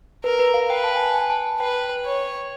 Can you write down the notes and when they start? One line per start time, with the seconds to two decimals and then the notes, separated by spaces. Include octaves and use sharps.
0.24 A#4 B4
0.39 B4
0.54 F5
0.69 B4 G5
0.84 A5
0.96 G#5
1.00 A5
1.14 G#5
1.30 A5
1.59 B4 G5
2.05 C#5